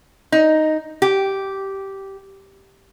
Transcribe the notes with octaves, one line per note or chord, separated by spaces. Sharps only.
D#4
G4